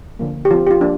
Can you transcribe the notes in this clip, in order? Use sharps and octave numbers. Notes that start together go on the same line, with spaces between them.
D3 F3 A#3
G4
F3 C4 F4
G4
F4
F3 A#3 D4